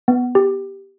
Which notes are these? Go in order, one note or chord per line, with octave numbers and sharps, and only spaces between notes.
B3
G4